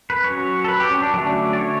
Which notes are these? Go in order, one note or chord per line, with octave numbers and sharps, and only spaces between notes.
B4
F#3 C#4 C#5
A4
B4
G4
C#4
D4
D3 F#3 A3 C#4 D4
D5
C#5